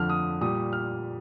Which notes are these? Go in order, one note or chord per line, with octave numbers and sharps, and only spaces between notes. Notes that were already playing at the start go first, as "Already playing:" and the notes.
Already playing: F2 D3 F3 F6
D#6
A#2 G3 D#6
F6